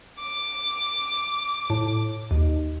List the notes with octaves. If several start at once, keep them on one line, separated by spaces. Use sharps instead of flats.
D6
A2
D#2